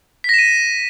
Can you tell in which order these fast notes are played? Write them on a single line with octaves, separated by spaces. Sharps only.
B6 A#6 E7 D#7